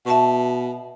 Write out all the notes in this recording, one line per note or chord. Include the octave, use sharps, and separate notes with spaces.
B2 E5 A5 C#6